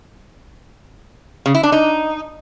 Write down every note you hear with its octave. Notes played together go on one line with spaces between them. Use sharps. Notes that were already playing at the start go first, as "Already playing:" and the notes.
C#3
E4
D4
D#4